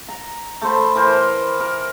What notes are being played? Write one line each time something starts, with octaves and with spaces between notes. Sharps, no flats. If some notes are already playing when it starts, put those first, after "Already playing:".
A#5
A3 A4 C5 B5
E3 A#4 C5
A#4